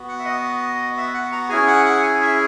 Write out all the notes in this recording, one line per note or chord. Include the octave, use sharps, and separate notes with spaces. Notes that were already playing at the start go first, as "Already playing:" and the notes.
Already playing: B3 F#4
F#5
E5
D#5
E5
F#5
A#5
C#4 E4 G#4 G#5
F#5
F#5
G#5
E5